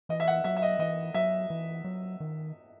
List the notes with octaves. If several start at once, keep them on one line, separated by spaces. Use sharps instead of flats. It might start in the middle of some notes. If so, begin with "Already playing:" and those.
E3 D#5
E5
F#5
F#3 E5
E5
D#5
E3 D#5
F#3 E5
E3
F#3
D#3